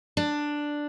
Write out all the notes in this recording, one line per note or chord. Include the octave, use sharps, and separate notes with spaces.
D4